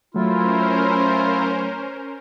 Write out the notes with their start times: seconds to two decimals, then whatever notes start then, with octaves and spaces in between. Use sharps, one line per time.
0.14 F#3 A3 C#4 E4 F4 A#4 C5